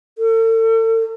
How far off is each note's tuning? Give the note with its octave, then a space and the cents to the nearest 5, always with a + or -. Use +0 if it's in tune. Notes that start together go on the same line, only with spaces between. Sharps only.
A4 +40